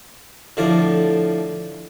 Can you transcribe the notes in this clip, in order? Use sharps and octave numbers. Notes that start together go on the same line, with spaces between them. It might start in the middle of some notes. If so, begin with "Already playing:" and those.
A2 D3 F3 A#4 D5